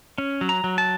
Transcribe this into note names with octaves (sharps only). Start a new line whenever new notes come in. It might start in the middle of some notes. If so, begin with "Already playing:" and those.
C#4
F#3
A#5
F#3
A5